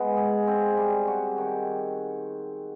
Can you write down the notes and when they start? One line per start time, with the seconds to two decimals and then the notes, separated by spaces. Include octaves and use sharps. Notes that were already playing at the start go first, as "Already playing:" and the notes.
Already playing: G#3 B3
0.17 G#4
0.47 C4
0.77 G3
1.07 F#4
1.38 D#3